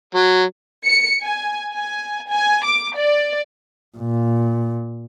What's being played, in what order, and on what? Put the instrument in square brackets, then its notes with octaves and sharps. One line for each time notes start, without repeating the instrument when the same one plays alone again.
[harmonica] F#3
[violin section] C#7
G#5
G#5
G#5
D6
D5
[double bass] A#2